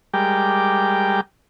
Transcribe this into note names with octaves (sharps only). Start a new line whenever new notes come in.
G3 G#3 G4 A#4 G5 D6